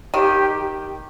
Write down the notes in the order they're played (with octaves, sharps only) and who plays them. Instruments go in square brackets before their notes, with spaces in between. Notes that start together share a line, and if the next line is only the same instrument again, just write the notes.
[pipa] D#3 [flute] G4